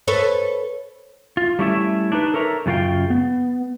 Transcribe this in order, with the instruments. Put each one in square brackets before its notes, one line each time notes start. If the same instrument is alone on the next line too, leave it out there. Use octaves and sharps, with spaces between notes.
[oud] A4 B4 C#5
[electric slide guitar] F4
G3 A3 C#4 E4 C#5 E5
D4 D#4 B4
A4 A#4 C#5 E5 A#5
F#2 C#3 F4 F#4 F5 G5
B3